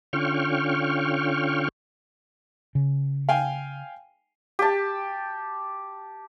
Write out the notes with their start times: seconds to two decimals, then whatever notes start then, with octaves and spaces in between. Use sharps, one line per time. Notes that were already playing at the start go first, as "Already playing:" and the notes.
0.13 D3 C#4 F4 G5 C#6 F6
2.75 C#3
3.29 F5 G5 G#5
4.59 G4 A5